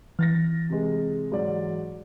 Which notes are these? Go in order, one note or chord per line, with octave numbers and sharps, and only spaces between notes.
E3 F6 A6 A#6
C3 G#3
G#2 F#3 D5